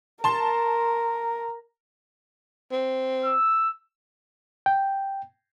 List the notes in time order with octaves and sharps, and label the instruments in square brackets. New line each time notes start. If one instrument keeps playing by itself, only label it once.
[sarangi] A#4 [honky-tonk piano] A5 C6
[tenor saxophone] C4
[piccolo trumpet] E6
[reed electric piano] G5